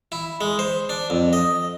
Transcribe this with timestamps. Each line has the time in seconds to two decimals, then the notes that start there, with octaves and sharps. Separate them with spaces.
0.12 E4
0.41 G#3
0.59 C5
0.89 D4
1.10 F2
1.33 D#5